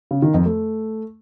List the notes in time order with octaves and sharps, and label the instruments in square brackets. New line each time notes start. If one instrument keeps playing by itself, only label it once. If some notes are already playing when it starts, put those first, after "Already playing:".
[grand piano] C#3
D#3
F2
A3